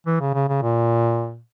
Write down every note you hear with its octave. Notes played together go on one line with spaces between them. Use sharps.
E3
C#3
C#3
C#3
A#2